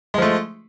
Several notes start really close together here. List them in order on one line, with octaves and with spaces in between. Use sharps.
G#3 F3 A3